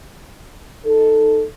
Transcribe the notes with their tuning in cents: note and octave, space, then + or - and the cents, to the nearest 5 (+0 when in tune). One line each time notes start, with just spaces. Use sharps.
D#4 +0 A4 +5